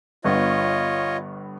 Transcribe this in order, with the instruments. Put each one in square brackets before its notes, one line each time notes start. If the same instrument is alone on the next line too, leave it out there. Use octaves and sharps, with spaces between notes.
[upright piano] G1 G2 B3 [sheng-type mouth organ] F4 C#5 D#5